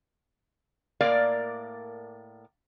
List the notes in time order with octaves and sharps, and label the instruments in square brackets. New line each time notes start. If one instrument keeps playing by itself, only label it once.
[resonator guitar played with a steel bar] A2 A#3 A#4 D5 F5